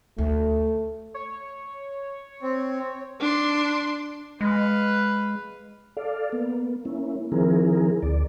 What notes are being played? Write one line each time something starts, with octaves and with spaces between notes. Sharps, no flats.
D2 A3
C#5
C4
D4 C6
G#3 B4 F5
A4 D5 F5
A#3 B3
A#3 C#4 E4
D#3 F3 C4 E4 G#4 A#4
D2 D5